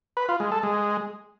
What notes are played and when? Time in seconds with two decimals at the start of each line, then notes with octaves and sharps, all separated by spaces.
0.17 B4
0.28 F4
0.40 G#3
0.52 A4
0.63 G#3